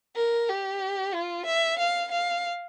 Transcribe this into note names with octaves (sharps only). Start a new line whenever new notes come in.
A#4
G4
F4
E5
F5
F5